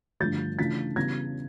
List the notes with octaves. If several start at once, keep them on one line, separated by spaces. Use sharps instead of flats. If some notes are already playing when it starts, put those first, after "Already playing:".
G2 D3 F3 A3 G6 A6
C#3 E3 A3 D4 F4 A6 B6
C#3 E3 G3 B3 G#6 A#6